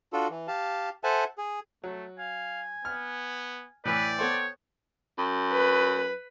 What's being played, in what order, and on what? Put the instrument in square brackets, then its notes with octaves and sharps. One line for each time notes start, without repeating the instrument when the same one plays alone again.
[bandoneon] D4 F4 F#4 A4
E3
G4 F5 A5
A4 C5 E5 F#5 G#5 A5
G#4
[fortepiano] F#3 [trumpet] A3
[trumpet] F5 [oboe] G#5
[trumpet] B3 [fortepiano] F6
[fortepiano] A2 E3 [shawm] B4 [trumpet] D5 [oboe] G5
[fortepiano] B3 A4 C5 [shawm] C#5
[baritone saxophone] F#2
[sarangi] B4